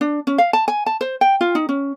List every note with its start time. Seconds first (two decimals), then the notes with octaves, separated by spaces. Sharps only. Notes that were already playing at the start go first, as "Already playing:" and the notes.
0.01 D4
0.27 C#4
0.38 F5
0.53 A5
0.68 G#5
0.86 A5
1.01 C5
1.21 G5
1.41 F4
1.55 D#4
1.69 C#4